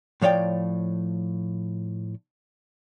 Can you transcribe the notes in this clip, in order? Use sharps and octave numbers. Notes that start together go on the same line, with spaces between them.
A2 F3 C#5 D5 G5